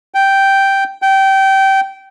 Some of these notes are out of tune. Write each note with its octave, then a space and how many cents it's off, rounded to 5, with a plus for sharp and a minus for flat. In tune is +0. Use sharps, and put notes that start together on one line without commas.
G5 -5
G5 -20